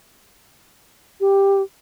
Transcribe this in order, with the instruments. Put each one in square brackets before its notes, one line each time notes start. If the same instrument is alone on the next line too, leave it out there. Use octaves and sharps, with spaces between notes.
[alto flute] G4